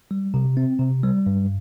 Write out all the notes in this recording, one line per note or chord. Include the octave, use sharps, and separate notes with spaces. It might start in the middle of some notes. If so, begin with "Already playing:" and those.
G3
C3
C4
C3
G3
G2